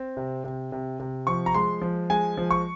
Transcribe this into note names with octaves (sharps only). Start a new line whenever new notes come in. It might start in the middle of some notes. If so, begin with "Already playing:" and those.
Already playing: C4
C3
C3
C3
C3
F3 C#6
A#5
G#3 C6
F3
G#3 G#5
F3
C#6